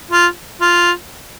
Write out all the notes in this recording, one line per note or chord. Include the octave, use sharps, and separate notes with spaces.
F4
F4